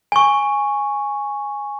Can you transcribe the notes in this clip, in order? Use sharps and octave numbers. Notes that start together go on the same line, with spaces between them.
G#5 C#6